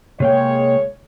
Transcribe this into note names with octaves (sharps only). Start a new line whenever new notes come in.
C3 G#3 A#3 C#5 G5